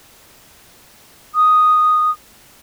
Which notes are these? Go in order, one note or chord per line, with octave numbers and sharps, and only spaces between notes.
D#6